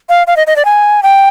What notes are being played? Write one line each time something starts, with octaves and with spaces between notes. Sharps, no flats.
F5
F5
D#5
D#5
D5
G#5
G5